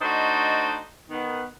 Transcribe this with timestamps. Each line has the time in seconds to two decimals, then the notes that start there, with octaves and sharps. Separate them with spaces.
0.02 A3 D4 D#4 F#4 C5 D#5
1.10 D#3 B3